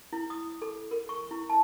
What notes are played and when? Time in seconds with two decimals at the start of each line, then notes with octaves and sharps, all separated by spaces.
0.13 E4
0.30 D#6
0.62 A4
0.91 A#4
1.09 C#6
1.31 E4
1.50 A5